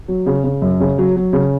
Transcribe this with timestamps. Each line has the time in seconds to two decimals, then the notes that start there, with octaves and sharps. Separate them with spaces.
0.08 F#3
0.26 C#3
0.44 C#3
0.62 F#2
0.80 C#3
0.98 F#3
1.16 F#3
1.33 C#3